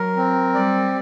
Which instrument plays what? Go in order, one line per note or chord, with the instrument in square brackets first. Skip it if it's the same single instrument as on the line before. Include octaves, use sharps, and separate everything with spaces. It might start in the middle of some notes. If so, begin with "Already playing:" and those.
Already playing: [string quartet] F#3 [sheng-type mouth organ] A#4
[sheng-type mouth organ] C4
[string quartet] G3 [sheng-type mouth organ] D5